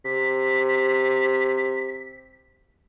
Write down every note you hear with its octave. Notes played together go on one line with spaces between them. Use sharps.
C3 B6